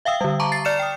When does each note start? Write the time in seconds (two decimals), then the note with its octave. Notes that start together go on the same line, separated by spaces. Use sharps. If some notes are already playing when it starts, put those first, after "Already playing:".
0.05 E5 F5 G5 D#6 E6
0.21 D3 G3
0.40 A5 A#5 C#6 D6
0.52 A6 C7
0.65 D5 F6 C#7 E7
0.79 G5 D#6